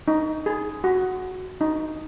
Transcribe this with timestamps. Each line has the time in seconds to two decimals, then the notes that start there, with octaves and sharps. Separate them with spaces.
0.08 D#4
0.46 G#4
0.84 F#4
1.61 D#4